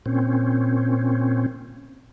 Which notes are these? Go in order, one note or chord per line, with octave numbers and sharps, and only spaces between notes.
A#2 C4 C#4